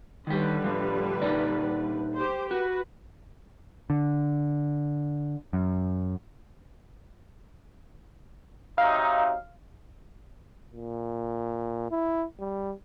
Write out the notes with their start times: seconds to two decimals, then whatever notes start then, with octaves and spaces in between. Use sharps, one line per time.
0.27 D3 D#3 G3 G4 B4
0.64 A2 F3
1.22 A#2 D#4 D5
2.15 G4 C5
2.51 F#4 B4
3.90 D3
5.53 F#2
8.78 C3 F#3 D#4 F5
10.74 A#2
11.91 E4
12.40 G3